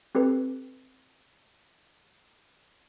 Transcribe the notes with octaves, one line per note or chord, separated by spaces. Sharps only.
C4 G4 A4 B4